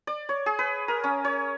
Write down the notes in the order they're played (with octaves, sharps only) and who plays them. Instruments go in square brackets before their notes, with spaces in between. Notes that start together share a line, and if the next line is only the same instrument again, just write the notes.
[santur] D5
C#5
G#4
B4
A#4
C#4
C#5